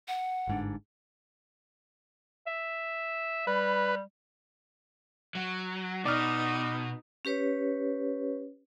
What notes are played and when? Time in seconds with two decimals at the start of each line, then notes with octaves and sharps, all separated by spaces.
0.08 F#5
0.48 G1 G#2 D4
2.47 E5
3.47 G3 B4
5.35 F#3
6.05 B2 D#4 D5 F6
7.25 C#4 G4 B4 C#5